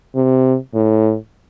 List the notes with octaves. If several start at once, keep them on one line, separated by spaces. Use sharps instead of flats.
C3
A2